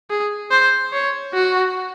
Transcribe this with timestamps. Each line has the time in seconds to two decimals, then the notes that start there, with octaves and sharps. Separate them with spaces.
0.10 G#4
0.51 C5
0.93 C#5
1.34 F#4